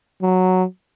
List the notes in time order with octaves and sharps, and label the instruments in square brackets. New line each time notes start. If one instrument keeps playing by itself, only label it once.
[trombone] F#3